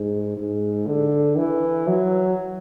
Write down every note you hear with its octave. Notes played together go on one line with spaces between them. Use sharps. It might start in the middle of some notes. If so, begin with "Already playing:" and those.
Already playing: G#2
G#2
D3
E3
F#3